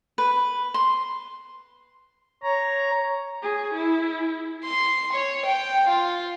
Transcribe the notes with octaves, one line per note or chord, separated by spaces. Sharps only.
B4
C6
C#5 A#5
G#4
E4
C6
C#5
G5
F4